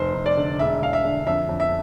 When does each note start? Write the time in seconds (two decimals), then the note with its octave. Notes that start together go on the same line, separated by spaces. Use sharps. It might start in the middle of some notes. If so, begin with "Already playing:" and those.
Already playing: F1 C5
0.14 F1
0.26 D5
0.37 D3
0.59 E1 E5
0.81 E1 F5
0.93 E5
1.04 D3
1.27 F2 E5
1.49 F2
1.60 E5